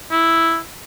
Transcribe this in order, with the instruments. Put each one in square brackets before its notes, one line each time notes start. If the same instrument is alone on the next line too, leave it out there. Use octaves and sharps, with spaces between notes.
[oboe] E4